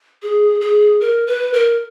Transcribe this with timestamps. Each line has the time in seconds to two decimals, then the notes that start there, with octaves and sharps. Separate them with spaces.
0.22 G#4
0.61 G#4
1.01 A#4
1.27 B4
1.53 A#4